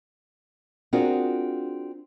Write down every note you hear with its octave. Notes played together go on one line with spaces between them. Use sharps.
C4 D4 F4 F#4 G#4 A#4